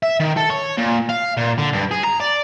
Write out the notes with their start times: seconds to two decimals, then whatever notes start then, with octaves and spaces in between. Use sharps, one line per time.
0.03 E5
0.20 D#3
0.37 A4
0.50 C#5
0.78 A#2
1.10 F5
1.37 A#2
1.58 D3
1.73 G2
1.91 G#4
2.04 A#5
2.20 D5